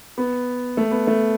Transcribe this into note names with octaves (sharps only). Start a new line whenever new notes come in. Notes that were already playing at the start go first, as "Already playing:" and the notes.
B3
A3
B3
A3